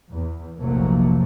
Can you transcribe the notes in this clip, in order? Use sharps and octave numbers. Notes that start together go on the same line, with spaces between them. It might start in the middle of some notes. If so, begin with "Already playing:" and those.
E2
F1 A#1 C3 F#3 A3 A#3